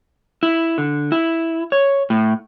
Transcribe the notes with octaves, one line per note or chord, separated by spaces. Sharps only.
E4
D3
E4
C#5
A2